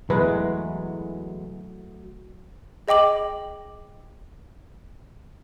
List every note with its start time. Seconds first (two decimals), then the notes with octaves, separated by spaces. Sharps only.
0.10 E2 F#3 G#3 A3 E4 B4
2.88 G#4 D#5 G5 D6 F#7